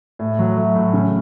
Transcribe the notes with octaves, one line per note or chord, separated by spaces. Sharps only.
A2
F#3
A3
A2
C#3